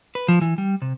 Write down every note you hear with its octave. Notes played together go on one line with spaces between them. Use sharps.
B4
F3
E3
G3
C3